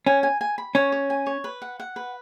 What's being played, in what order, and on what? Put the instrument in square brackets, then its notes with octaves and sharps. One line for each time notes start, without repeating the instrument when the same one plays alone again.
[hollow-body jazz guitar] C#4 [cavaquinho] G#5
[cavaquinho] G#5
G#5
B5
[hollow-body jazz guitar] C#4 [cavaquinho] C#5
[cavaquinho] C#5
G#5
C#5
B4
F#5
F#5
B4